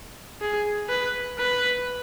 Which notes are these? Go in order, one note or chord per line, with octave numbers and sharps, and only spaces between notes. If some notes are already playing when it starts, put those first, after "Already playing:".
G#4
B4
B4